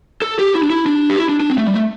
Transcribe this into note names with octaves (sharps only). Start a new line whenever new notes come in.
A4
G4
E4
D4
E4
D4
G4
E4
D4
D4
C4
A3
G3
A3